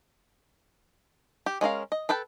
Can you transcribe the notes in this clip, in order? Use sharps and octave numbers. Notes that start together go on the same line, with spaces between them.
G4
G#3 C#4 A#4 F5
D#5
A4 B4 G5 A5